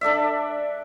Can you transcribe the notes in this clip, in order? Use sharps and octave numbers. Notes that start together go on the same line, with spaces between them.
D4 A4 D5 E5